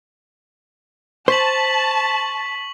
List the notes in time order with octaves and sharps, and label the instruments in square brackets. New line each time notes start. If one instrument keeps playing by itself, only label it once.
[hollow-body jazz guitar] C5 [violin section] A5 [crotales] C#6 B6 F#7